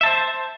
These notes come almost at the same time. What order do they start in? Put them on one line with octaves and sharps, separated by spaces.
E5 A5 C5